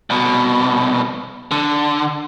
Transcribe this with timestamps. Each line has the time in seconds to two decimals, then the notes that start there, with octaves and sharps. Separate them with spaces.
0.10 C2 B2
1.51 D3